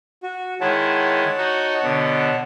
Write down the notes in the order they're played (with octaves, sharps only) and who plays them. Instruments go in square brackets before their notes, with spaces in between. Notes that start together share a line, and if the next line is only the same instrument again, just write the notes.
[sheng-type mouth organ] F#4
[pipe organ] D#3 G#3 E4 [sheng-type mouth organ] C#5 F#5 A5
[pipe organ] D#4 F#4
B2 D3